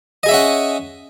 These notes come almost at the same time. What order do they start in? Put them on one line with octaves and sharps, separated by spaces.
D#5 G#4 E5 C#4 F#5